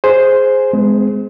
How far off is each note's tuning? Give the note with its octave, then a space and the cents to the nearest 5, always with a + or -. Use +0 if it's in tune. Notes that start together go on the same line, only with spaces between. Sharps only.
G#4 +0 C5 +0
G#3 +10 C4 -45